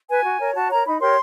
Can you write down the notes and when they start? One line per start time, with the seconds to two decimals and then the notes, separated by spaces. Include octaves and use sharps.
0.09 B4 G#5
0.24 F#4
0.39 A#4 C#5
0.54 F#4 A5
0.69 A#4 C#5 A#5
0.85 D#4 B5
1.00 G4 A#4 C#5 C6